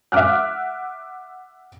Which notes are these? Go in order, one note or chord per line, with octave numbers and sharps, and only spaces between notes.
E5 F#5 D6 F6 F#6